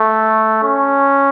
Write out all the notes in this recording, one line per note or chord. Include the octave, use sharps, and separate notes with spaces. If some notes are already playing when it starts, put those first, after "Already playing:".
Already playing: A3
C#4